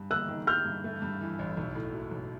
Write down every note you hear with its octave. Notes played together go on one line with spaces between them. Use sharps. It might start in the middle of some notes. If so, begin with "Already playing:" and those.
Already playing: G2
A#3 E6 F#6
D#3
G3 F6 G6
G2
A3
G2
E3
A1
B1
A2
F#3
B1